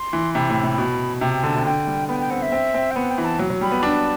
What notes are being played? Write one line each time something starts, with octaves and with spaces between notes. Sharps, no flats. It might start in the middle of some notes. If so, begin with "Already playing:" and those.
Already playing: C6
E3
C3 B5
A2
C3
B2
C3 G5
D3 A5
C3
D3 G5
G3
B3 G5
G5
C4 F#5
E5
C4
C4
G5
B3 F#5
G5
E3 B5
A5
F#3
F#3
G3 B5
B3
D4 A5